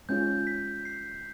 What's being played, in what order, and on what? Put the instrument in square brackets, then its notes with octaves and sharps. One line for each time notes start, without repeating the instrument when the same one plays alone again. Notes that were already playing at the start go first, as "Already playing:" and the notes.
[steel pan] G#3 C#4 F4 [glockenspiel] G6
[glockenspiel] B6
C7